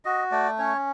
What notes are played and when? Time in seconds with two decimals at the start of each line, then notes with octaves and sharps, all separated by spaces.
0.05 F#4 D#5
0.32 A3 D5
0.58 C#4 C#5